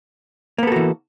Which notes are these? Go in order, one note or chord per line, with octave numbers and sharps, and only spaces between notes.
E3 A#3 B3 F#4 A4